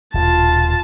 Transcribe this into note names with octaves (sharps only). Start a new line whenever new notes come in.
D#1 B2 F4 A5